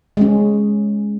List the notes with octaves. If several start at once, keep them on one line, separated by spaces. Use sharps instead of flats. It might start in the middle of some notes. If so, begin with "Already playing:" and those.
G#3 C#4